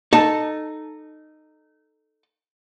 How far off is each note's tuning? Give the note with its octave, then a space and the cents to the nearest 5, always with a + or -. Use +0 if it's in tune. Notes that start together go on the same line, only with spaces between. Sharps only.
D#4 -15 A4 +0 A5 +0